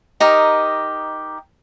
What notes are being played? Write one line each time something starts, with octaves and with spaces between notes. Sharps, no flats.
D#4 G4 A#4 D#5